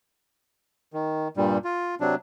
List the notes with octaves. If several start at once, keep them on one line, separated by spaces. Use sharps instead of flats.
D#3
G2 A#2 G3
F4
C3 F#3 D4